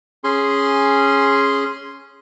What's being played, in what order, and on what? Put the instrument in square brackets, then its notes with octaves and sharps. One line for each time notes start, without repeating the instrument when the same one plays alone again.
[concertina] C#4 G#4 C6